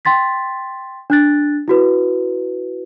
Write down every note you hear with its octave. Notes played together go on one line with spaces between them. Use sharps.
G5 C6 A6 B6
D4 F#6 A6
E4 F#4 B4